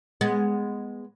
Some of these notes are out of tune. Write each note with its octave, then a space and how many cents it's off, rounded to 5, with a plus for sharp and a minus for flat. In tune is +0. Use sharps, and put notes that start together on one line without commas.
G#3 -5 B3 +0